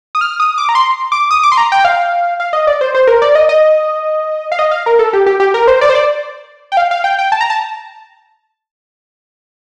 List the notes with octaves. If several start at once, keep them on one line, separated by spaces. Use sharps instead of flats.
D#6
F6
D#6
D6
A#5
C6
D6
D#6
D6
C6
A#5
G5
F5
F5
D#5
D5
C5
C5
A#4
D5
D#5
D#5
F5
D#5
F5
A#4
A4
G4
G4
G4
A#4
C5
D5
C5
D5
G5
F5
F5
G5
G5
A5
A#5
A5